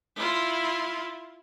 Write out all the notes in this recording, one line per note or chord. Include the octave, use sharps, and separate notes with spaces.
E4 F4